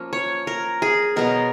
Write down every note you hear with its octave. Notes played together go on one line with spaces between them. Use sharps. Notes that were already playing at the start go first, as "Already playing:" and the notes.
Already playing: F3 A#3 C#4
C#5
A#4
G#4
B2 F#3 B3 A#4